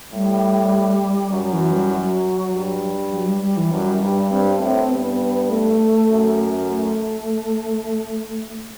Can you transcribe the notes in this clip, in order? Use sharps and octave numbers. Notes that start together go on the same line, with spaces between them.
A2 G3
F#2 F#3
E3
G3
F#3
G2
F#3
G3
G3
E3
F#2 G3
G2
G2 C4
A2 C4
G2 B3
A3
F#2
A3